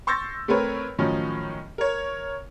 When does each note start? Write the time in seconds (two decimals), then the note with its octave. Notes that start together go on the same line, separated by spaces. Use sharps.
0.07 C6 C#6 E6 G6 A6 A#6
0.48 A3 C4 A#4 B4 C#5
0.98 A2 D#3 F3 F#3 C#4
1.78 A#4 C#5